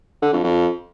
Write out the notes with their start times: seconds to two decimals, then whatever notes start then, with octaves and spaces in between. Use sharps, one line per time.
0.22 D3
0.33 F2
0.44 F2